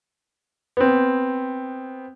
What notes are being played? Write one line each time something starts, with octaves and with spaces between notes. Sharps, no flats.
B3 C4